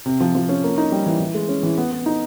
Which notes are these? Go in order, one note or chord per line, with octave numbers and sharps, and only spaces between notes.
C3
F3
F3
C#4
A#3
D#4
G3
E3
E3
G#3
C#4
E3
B3
B3
D#4